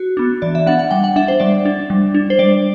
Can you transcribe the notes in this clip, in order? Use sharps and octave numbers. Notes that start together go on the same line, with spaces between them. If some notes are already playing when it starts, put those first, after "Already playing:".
Already playing: F#4
B3 D4
E3 D5
E5
B3 D4 F#5
F#5
G3 G5
F#5
D4 E5
C5
G3 D5
D4
G3
D4
C5
G3 D5